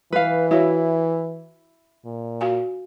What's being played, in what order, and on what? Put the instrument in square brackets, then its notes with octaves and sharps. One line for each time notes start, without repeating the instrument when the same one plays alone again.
[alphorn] E3 [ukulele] B4 F5
[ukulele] E4 [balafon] F#4 C#5 F5
[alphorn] A#2
[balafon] F#4 F5 G#5